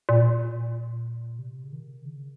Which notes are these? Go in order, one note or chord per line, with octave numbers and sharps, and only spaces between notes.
A#2
C3
C#3
D#3
C#3